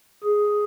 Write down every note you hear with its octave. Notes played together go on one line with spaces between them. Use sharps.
G#4